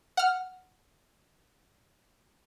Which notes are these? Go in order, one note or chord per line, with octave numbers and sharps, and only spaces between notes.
F#5 F6